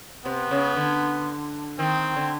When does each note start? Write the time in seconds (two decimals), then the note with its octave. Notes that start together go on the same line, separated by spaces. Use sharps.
0.25 C3 B3
0.51 C#3
0.76 D3
1.78 D#3 C4
2.16 D3